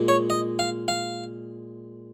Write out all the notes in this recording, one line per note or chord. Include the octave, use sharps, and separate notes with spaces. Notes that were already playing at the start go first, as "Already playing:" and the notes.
Already playing: A#2 G#3
C#5
D#5
F5
F5